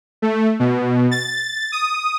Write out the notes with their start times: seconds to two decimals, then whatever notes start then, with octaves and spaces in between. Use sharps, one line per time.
0.22 A3
0.60 B2
1.11 A6
1.72 D#6